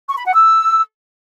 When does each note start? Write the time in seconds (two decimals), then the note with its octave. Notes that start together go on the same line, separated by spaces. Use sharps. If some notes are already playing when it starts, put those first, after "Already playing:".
0.08 C#6
0.17 B5
0.26 F#5
0.34 E6